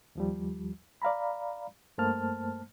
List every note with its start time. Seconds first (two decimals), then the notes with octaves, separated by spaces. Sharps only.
0.15 D#2 F3 G3
1.02 D5 F5 A#5 B5
1.98 G2 A3 A#3 C5 A5 F6